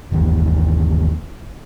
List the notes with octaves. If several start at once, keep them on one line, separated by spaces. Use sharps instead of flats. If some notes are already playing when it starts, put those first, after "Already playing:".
G1 D#2 D#3 E3